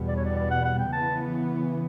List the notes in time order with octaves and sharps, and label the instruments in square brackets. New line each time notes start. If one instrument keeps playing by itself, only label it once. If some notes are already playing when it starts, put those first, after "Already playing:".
Already playing: [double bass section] E2 B2 G3 B3
[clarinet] D5
C#5
D5
D5
F#5
F#5
G5
[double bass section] C#3 E3 B3 [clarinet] A5